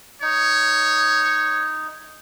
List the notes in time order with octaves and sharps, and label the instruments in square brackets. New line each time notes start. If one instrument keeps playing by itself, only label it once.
[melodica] D#4 [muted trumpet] C#5